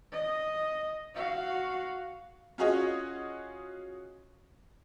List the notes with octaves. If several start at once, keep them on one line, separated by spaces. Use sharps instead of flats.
D#5
F#4 F5
C#4 F4 F#4 G#4 C#5 D#5